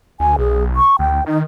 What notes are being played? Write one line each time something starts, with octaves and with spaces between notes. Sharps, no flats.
D2 G#5
B1 G#4
C#6
D2 G5
D#3 D#4